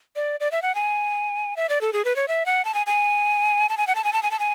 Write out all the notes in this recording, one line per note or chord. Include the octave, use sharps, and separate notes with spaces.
D5
D5
E5
F#5
G#5
E5
D5
A4
G#4
B4
C#5
E5
F#5
A5
G#5
G#5
A5
G#5
F#5
A5
G#5
A5
G#5
A5
G#5